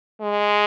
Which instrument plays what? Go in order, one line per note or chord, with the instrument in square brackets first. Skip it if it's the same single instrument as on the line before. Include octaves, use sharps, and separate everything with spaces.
[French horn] G#3